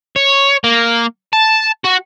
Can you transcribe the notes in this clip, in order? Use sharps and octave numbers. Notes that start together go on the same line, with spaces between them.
C#5
A#3
A5
F#4